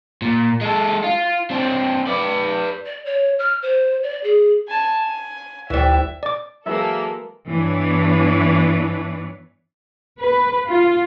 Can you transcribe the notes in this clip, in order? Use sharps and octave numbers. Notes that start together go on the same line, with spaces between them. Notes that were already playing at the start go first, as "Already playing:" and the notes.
A#2
G#3 A4
F4
C4 D4
B4 D5
D5
C#5
F6
C5
D5
G#4
G#5 A5
G#5
D2 E3 G3 E4 C5 E5
D5 D6
E3 F#3 G#3 A#3 A4 E5
G2 E3 B3 D4 B4 C#5
B4
F4